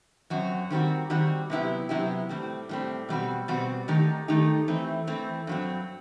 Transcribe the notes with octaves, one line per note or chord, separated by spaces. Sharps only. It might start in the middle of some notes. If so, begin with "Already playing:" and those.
F#2 F#3 C4 F#4
D#3 G3 C4 F#4
D#3 G3 C4 F#4
C3 F#3 B3 E4 G4
C3 F#3 B3 E4 G4
A2 G3 C4
A2 G3 C4
B2 G3 C4 F#4
B2 G3 C4 F#4
D#3 A3 D#4 G4
D#3 A3 D#4 G4
E3 A3 C4
E3 A3 C4
G2 F#3 C4